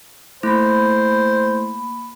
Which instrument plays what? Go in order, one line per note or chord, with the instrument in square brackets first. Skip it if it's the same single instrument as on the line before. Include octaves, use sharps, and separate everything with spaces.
[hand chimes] A3 E4 [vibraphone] A#3 B5 [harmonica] C5